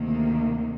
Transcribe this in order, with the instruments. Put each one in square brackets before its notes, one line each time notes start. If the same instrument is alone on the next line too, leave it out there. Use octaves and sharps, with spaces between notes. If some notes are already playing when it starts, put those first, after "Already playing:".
Already playing: [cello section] D2 C3 D#3 A#3